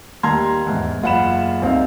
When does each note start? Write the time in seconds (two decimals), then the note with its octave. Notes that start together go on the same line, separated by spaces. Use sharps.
0.23 D#2 G3 A5 A#5 C6 G#6
0.66 E2 G#2
1.02 F#1 F4 F5 F#5 B5 E7
1.62 C2 C4 D#4 F5